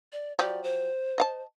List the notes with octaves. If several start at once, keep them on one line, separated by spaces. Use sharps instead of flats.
D5
F3 F#3 G4 D5
C5
D#5 F5 A5